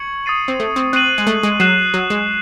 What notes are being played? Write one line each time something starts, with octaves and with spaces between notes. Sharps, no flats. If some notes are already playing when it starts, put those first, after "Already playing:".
Already playing: C#6 G#6 C#7 F#7
D#6 A6 C7 D#7
C4
A3
C4
C4 F#6 C7 D#7 F#7
G#3
A3
G#3
F#3 F#6 C7 E7
F#3
G#3